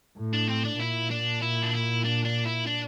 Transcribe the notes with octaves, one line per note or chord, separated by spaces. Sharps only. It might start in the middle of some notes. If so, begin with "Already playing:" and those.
A2
D4
C4
D4
A#2 E4
D4
E4
D4
E4
D4
D4
E4
D4